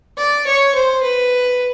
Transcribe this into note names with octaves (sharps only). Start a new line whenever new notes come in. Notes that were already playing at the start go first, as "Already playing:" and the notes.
D5
C#5
C5
B4